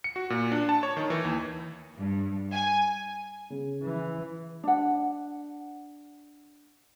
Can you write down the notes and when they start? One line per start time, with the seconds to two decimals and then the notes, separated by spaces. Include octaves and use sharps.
0.04 C#7
0.16 F#4
0.30 A#2
0.52 D4
0.69 A5
0.83 C#5
0.97 D#3
1.10 E3
1.25 D#2
1.97 G2
2.53 G#5
3.50 C#3
3.83 E3
4.63 D4 F#5